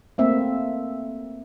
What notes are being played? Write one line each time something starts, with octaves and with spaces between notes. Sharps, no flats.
A3 A#3 C4 E5